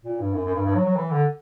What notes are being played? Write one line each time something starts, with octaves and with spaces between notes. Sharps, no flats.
A#2
G2
F#2
F#2
G2
G2
F#3
F#3
E3
D3